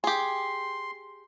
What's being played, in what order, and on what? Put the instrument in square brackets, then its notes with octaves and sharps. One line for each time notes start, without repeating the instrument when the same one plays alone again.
[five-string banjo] G4 G#4 [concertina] C6